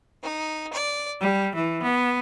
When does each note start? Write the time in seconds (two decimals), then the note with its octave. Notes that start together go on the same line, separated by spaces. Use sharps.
0.24 D#4
0.73 D5
1.20 G3
1.54 E3
1.83 B3